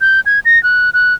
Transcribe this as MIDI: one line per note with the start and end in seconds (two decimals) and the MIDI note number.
0.01 0.20 91
0.26 0.40 92
0.45 0.62 94
0.63 0.90 90
0.94 1.14 90